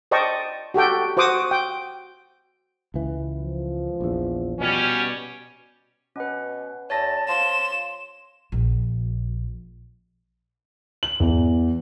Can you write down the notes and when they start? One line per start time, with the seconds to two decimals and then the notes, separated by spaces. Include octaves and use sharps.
0.11 C5 D5 D#5 G5 A5 C#6
0.74 F#4 G4 A4 G5
1.17 F#4 C5 F#5 D6 D#6
1.51 G5
2.94 C#2 E3
3.43 F3
4.00 A#1 E2
4.61 B2 G3 C#4
6.16 B2 C#4 B4
6.90 E2 C#5 A5 A6 A#6
7.28 F3 C6 E7
8.52 A#1
11.03 F#7
11.20 E2